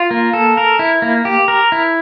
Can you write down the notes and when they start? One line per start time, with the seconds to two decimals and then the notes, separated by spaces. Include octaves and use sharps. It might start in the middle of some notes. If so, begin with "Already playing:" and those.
Already playing: F4
0.11 A#3
0.33 A4
0.57 A#4
0.79 E4
1.02 A#3
1.25 G4
1.48 A#4
1.72 E4